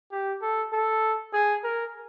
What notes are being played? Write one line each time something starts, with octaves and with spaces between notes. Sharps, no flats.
G4
A4
A4
G#4
A#4